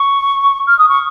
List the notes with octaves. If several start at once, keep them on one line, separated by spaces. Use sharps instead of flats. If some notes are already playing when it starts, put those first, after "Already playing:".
Already playing: C#6
F6
D#6
C#6